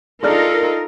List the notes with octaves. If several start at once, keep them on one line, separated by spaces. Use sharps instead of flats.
G#3 D4 D#4 F4 A4 A#4 F6